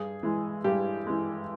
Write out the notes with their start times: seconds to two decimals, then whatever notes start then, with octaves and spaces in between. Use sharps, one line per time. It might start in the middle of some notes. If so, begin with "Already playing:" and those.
Already playing: G2 G#4
0.23 E3 G#3
0.64 G2 G4
1.07 E3 G#3